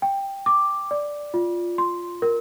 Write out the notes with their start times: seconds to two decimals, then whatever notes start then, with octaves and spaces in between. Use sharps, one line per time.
0.02 G5
0.46 D6
0.91 D5
1.34 F4
1.78 C6
2.22 A#4